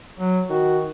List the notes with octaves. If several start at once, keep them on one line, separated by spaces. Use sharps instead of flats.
F#3
D#3 F#4